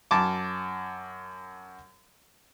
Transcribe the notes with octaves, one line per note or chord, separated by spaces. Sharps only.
F#2 A5 D6